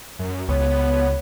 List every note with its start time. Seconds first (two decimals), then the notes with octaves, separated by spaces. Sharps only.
0.19 F#2
0.49 C#2 B3 C#5